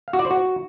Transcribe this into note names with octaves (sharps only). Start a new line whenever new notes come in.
F5
F#4
D5
C5
F#4